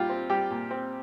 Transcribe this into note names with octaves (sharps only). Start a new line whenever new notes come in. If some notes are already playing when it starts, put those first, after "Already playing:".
Already playing: A#2 G3 F4 G4
C4
G3 G4
A#2
C4